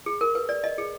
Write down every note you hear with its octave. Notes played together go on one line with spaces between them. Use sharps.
G#4
A#4
B4
D5
D#5
G#4